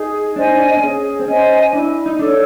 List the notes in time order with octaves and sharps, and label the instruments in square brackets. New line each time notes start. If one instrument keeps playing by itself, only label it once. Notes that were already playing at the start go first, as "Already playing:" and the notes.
Already playing: [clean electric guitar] D#4 [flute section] G#4
[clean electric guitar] D4 [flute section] C5 D#5 G#5
[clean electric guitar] D#4
D4
C4
[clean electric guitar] C#4 [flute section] G#4
[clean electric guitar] C4
[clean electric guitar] C#4 [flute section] C5 D#5 G#5
[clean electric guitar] D4 [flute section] E4
[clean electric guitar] D#4
[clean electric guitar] D4 [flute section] A4 C#5